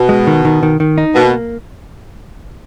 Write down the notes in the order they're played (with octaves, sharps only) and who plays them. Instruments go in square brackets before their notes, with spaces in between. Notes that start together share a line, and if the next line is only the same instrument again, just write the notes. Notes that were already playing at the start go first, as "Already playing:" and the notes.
Already playing: [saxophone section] B2
[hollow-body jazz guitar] G#3
D#3
D#3
D#3
D#3
D#4
[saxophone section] B2 [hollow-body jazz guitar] A#3